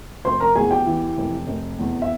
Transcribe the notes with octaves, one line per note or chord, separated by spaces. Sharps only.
F1 C5 C6
A#4 A#5
E2 G#4 G#5
G4 G5
E3
F1
F1
E2
E5